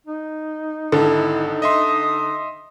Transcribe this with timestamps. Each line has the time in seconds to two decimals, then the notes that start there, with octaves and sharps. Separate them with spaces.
0.07 D#4
0.92 G#1 D3 E4 A4
1.62 D#5 E5 C6 D#6